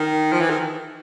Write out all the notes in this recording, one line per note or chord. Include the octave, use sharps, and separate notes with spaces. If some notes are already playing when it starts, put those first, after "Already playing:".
Already playing: D#3
F3
E3
D#3